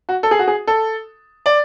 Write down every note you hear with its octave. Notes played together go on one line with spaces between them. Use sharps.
F#4
A4
G#4
F#4
G#4
A4
D5